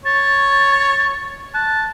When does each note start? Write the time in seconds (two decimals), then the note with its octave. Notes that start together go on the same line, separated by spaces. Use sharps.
0.05 C#5 A6
1.54 A5 F#6